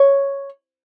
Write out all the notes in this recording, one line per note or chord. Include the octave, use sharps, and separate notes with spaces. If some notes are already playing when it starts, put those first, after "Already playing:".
Already playing: C#5